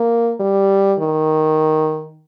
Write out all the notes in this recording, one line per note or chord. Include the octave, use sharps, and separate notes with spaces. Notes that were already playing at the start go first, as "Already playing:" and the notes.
Already playing: A#3
G3
D#3